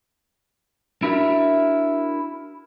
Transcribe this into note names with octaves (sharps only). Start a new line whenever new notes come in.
D4 E4 F#4 A#4 E5